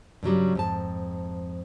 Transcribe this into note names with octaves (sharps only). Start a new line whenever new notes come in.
G2 C#3 F#3 G3
F2 G#2 A5